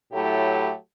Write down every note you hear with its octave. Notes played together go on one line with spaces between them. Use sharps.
A2 F#3 A3 E4 G4